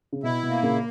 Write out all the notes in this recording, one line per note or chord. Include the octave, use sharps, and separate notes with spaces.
C#3
B2 E4
B2
A#3
A#2 C#3